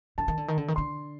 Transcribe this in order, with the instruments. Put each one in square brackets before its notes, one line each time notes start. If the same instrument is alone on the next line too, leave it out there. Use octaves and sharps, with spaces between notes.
[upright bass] D3 [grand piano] A5
[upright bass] D#3
D3
D#3
D3
D#3
[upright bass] D3 [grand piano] C6